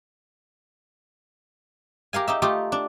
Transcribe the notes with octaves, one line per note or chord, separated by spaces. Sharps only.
G4 A#4 F5 G#5
D#4 G4 E5
A3 D#4 F4 G4
D4